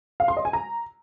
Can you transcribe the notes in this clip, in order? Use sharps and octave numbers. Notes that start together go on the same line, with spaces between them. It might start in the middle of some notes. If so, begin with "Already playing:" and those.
F5
C6
D#5
G#5
A#5